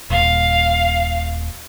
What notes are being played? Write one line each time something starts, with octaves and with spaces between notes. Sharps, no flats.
D#1 F5